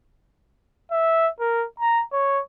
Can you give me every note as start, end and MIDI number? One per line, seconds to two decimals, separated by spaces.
0.92 1.29 76
1.40 1.65 70
1.80 2.03 82
2.13 2.41 73